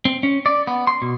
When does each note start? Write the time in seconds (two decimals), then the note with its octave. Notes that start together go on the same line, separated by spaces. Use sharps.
0.05 C4
0.23 C#4
0.46 D5
0.67 B3
0.87 C6
1.02 B2